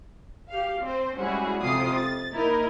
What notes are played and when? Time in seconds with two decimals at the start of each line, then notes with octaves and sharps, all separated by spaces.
0.49 G4 F5
0.81 C4 C5
1.17 G3 G#3 C#4 E4 F#4 G#4
1.60 F2 C3 F4 D6 D#6 C7
1.96 A6
2.33 A#3 D#4 E4 A#4 D#5